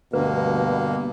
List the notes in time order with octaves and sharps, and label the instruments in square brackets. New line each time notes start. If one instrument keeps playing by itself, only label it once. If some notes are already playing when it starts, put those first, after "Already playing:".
[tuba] D2 [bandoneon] G2 A#3 [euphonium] B2 [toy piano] B4